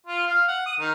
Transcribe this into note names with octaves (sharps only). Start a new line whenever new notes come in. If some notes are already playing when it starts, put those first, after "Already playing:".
F4
F5
F#5
D#6
D#3